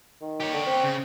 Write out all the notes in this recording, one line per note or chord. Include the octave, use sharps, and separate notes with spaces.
D#3
G4 C#5
D3
C4
C#3